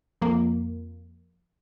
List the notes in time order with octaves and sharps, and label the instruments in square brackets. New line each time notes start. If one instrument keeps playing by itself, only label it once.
[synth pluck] F2 A#3